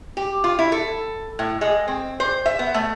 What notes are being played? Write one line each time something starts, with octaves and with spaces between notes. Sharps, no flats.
G4
F4
E4
A4
A2
G#3
C4
C5
E5
B3
A3